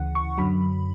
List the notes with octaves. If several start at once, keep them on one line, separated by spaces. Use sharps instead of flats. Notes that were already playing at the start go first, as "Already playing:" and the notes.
Already playing: D2 C#3 E3 F#5
C#6
F#2 D3 F#3 B5